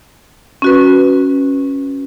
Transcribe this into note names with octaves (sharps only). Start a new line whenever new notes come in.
C#4 F#4 B4